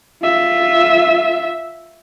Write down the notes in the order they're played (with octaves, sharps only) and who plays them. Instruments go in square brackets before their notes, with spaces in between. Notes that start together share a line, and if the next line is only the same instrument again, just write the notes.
[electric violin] F4 E5